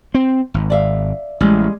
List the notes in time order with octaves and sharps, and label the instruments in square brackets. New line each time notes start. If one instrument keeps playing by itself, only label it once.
[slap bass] C4
G#1
[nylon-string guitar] D5 E5 F5
[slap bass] A1 [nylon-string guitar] G3 G#3